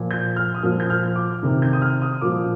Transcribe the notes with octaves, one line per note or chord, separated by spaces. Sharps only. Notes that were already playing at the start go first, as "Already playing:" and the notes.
Already playing: A#2 F3
G6
F6
D#6
A#2 F3 F6
G6
F6
D6
C3 D#3
G6
D#6
F6
D#6
A#2 F3 D6